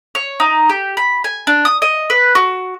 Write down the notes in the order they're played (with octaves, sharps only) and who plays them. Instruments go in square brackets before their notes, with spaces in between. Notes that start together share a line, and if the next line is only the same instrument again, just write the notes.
[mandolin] C#5
D#4
G4
B5
G#5
D4
D#6
D#5
B4
F#4